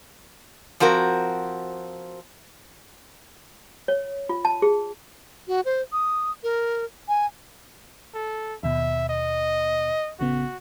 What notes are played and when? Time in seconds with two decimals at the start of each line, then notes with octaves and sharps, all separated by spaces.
0.80 F3 C4 F#4 A#4
3.88 C#5
4.29 F4
4.45 A5
4.62 G#4
5.48 F#4
5.65 C5
5.92 D#6
6.43 A#4
7.09 G#5
8.14 A4
8.63 D#2 B2 E5
9.09 D#5
10.20 A1 C#3 B3 F#4